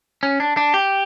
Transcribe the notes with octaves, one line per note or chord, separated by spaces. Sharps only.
C#4
D4
D4
G4